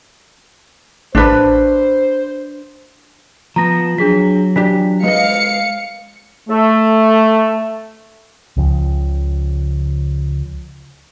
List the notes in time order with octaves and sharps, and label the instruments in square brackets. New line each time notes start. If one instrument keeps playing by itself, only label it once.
[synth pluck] A1 [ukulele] D4 B4 [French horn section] C5
[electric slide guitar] F3 B3 [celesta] A#5 A#6
[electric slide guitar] F#3 [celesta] D4 G#4 B6
[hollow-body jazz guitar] E3 D4 G4 [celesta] F4 B6
[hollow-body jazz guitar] G#3 B4 D#5 [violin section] F5 C#7
[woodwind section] A3
[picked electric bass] C#2 C#3 F3